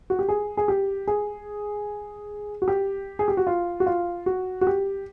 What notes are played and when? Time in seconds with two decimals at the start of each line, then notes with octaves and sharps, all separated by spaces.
0.10 F#4
0.19 G4
0.29 G#4
0.57 G#4
0.68 G4
1.07 G#4
2.62 F#4
2.68 G4
3.19 G#4
3.28 G4
3.37 F#4
3.47 F4
3.80 F#4
3.86 F4
4.26 F#4
4.61 F#4
4.67 G4